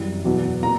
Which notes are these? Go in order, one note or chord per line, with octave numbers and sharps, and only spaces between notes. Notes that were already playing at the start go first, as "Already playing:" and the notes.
Already playing: F#2 E3 G3
E2 B2 F#3
A#2 A#5